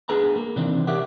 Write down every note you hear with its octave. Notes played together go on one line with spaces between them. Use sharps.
B3 D4 G#4 A4 B4 A#5
A#3
C3 D#3 E3 C4 D4
G4 A#4 C#5 D5 E5 F#5